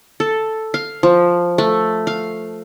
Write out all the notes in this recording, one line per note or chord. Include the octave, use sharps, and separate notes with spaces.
A4
F5
F3
A3
F5